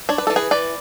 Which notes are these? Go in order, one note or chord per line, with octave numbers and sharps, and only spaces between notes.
D4 C#5
B4
E3 A4
G#4 B4
E3 B4 D5